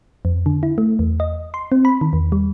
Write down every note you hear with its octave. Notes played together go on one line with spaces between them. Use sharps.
F2
D3
E4
A3
E2
D#5
C6
C4
B5
D#3
E2
G3